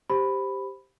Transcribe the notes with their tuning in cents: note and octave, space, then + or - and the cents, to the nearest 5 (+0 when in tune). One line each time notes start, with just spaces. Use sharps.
G4 +0 C5 +0 B5 +5